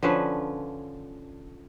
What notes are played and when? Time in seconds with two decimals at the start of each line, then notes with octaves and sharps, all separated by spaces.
0.03 D3 F3 C#4 B4